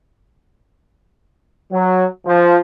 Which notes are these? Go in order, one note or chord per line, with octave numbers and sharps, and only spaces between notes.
F#3
F3